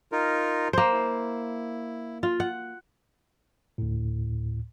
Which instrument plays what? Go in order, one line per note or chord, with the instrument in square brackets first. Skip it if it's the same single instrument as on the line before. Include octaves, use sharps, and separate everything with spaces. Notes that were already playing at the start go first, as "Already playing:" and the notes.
[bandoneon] D#4 F4 A#4
[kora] A#3 C5
[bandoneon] E4
[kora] F4
F#5
[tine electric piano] D2 A2